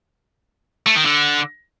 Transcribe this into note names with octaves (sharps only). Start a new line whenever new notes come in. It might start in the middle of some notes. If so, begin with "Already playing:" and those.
A3
D#3
D3